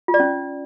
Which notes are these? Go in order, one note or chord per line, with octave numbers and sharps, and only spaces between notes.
F4
D5
C#4